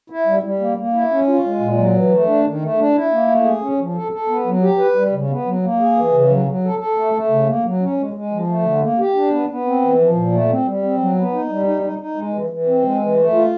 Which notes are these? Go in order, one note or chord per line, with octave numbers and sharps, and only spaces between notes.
E4
G3
G3
A#3
A#3
E4
C#4
F4
G#3
A#2
F#3
E3
A3
D4
D#3
A3
D4
E4
A#3
A3
G#4
C#4
F3
A4
A4
B3
F#3
G4
B4
G3
C#3
B3
F#3
A#3
G#4
E3
C#3
F#3
F#3
A4
A4
A3
A3
C#3
A#3
F#3
C#4
G#3
G#3
F3
A3
D3
A#3
G4
D4
B3
B3
C4
E3
F3
A#2
A3
C4
G3
C4
F#3
B3
D#4
G3
D#4
D#4
D#4
G#3
E3
E3
C4
G#3
E3
A3
F4